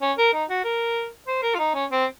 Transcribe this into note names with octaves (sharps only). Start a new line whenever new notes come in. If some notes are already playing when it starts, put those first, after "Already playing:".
C#4
A#4
D#4
F#4
A#4
C5
A#4
F4
D#4
C#4
C4